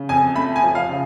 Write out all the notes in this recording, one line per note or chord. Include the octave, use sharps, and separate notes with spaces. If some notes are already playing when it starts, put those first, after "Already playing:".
Already playing: C#3
F2 G#5
A3 B5
G#5
F3
F5
C#3